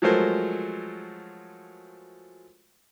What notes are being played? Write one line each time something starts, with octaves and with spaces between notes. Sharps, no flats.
F3 F#3 G#3 A3 A#4 C5